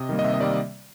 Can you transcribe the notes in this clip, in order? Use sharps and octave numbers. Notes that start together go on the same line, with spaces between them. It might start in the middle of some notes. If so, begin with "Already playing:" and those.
Already playing: C3 D#5
D#3 G3 A#3
D#5
C3 E5
D#5
D#3 G3 A#3 D5